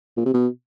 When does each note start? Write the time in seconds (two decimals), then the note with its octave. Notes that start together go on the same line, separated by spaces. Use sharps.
0.17 A#2
0.25 C3
0.34 B2